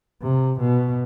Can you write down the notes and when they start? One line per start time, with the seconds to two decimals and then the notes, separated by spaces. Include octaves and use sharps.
0.22 C3
0.60 B2